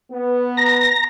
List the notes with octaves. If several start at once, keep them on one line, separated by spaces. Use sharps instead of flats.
B3
A#5 A#6